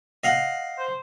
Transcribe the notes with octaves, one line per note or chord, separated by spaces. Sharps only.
D#5 F5 F#5
C5